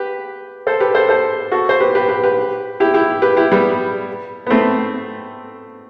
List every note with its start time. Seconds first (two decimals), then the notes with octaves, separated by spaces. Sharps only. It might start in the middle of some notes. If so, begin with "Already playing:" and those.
Already playing: G4 B4
0.67 A4 C5
0.80 G4 B4
0.94 A4 C5
1.08 A4 C5
1.51 F#4 A4
1.69 C5
1.80 G4 B4
1.95 G4 B4
2.09 G4 B4
2.23 G4 B4
2.80 E4 G4
2.94 E4 G4
3.22 G4 B4
3.37 E4 G4
3.51 G3 B3
4.46 B3
4.50 A3 C4